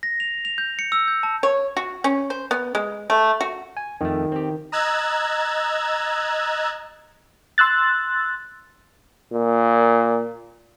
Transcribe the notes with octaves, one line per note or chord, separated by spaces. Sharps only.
A#6
F7
F7
G6
C#7
E6
G6
A5
C#5
F#4
C#4
C5
B3
G#3
A3
F#4
G#5
F2 D#3 A3
C4 G4
D#5 A#5 E6 F#6 G#6 A6
C6 E6 F#6 A6
A#2